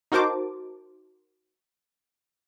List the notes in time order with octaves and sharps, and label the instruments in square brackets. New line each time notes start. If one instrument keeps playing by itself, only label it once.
[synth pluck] D#4 F#4 A#4 C5 A5 D6